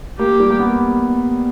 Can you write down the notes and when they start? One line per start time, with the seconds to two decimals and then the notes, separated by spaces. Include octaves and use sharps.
0.19 A#3 G4
0.40 G3
0.50 A#3
0.59 B3